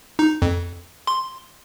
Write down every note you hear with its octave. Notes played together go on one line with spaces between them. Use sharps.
D#4
F2
C6